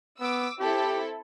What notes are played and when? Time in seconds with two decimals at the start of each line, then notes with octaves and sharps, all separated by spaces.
0.20 B3 D6 E6
0.60 C4 E4 G4 A4